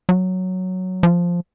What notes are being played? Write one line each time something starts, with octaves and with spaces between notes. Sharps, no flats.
F#3
F3